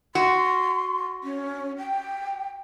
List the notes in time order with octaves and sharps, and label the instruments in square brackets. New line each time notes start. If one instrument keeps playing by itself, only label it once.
[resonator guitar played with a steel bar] F#4 [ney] C6
[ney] C#4
G5